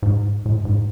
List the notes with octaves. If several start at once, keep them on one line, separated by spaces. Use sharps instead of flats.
G#2
A2
G#2